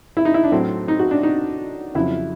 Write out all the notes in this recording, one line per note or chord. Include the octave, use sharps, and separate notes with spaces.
E4
D#4
E4
D4
A2 F#3 A3 C4
D#4
F#4
D4
D#4
F2 C#3 F#3 E4